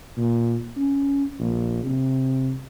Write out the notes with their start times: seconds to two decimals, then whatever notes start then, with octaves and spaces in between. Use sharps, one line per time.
0.17 A#2
0.77 C#4
1.40 A#1
1.83 C3